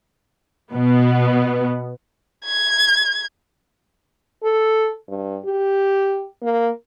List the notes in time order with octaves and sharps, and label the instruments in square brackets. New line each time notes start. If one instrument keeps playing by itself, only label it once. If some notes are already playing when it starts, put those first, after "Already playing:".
[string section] B2 B3
[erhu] G#6
[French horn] A4
G2
G4
A#3